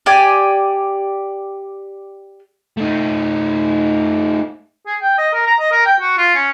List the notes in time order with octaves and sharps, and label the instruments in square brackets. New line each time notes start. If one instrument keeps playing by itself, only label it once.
[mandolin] G4 D5 G#5
[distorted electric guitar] A3 D#4
[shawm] G#4
G5
D#5
A#4
A#5
D#5
A#4
G5
F#4
F4
C#4